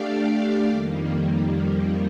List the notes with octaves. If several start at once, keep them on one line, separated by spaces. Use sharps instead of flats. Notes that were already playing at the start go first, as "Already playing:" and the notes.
Already playing: A3 D4 G4 D5 F5
F2 D#3 G3 A#3